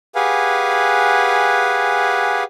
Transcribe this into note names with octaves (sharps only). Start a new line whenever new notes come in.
G4 G#4 B4 F5 F#5 G#5